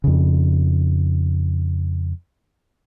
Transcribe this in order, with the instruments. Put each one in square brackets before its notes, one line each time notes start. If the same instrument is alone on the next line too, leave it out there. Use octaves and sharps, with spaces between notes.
[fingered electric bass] F2 C#3